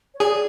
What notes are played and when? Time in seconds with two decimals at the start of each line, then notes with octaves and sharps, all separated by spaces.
0.14 C#5
0.20 G#4 D5